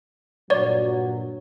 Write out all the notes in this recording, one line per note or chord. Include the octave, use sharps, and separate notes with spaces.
G2 A#2 F#3 C#5 D5